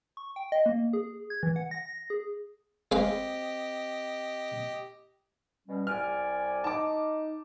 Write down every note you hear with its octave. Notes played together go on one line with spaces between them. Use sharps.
C#6
G5
D#5
A#3
G#4
G#6
E3
F#5
A#6
G#4
G#3 C4 G4 B4 D#5 F5
B2 G3 C#4
C2 D5 G#5 F6
D#4 A5 D6